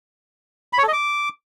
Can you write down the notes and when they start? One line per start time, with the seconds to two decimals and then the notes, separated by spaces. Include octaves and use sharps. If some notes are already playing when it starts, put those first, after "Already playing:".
0.73 B5
0.78 C#5
0.83 A4
0.88 D#5
0.93 D6